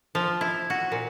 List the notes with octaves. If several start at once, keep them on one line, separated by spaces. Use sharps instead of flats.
F3
E4
F#4
A#2